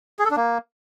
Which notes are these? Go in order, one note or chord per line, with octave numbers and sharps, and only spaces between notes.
G#4
A4
D4
A#3